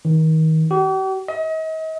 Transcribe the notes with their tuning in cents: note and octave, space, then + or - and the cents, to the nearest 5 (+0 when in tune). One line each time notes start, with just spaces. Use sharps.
D#3 +30
G4 -45
D#5 +40